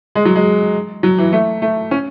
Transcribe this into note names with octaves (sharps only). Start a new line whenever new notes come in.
G#3
F#3
G#3
F#3
E3
A3
A3
C#4